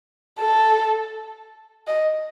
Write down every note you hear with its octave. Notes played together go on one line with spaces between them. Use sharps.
A4
D#5